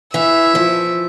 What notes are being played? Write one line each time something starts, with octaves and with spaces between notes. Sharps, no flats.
E3 E5
F3